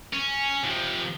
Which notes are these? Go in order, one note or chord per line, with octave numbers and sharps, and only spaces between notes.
C#4
C3 F3